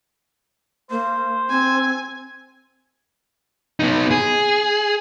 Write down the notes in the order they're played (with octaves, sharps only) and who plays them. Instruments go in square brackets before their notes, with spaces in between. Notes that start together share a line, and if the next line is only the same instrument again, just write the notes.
[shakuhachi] A#3 [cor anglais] C5
[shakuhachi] C4 [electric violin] G#5
[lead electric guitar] B3 D#4
G#4